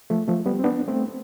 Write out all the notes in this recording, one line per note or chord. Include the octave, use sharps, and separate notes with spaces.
F3 A3
F3 A3
G3 B3
C4
B3 D4
A3 C4